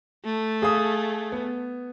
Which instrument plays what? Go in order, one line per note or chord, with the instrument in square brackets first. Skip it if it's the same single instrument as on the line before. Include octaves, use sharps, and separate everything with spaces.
[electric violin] A3
[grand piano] G#4 F5 D#6
B3